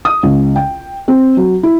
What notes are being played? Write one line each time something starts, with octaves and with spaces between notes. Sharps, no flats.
D#6
C#2
G5
C4
F#3
E4